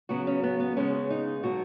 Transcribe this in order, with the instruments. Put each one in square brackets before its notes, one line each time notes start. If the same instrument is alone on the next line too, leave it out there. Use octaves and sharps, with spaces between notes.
[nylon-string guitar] C#3 F#3 B3 F#4
C#4
B3
B3
C#3 G#3 B3 C#4
D#4
B2 F#3 B3 F#4